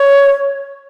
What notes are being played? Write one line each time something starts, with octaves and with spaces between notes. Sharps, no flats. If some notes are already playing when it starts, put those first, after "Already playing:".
Already playing: C#5